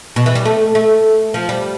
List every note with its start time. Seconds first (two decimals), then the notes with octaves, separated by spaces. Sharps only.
0.16 B2
0.26 E3
0.35 G3
0.45 A3
0.75 A3
1.34 F3
1.49 G3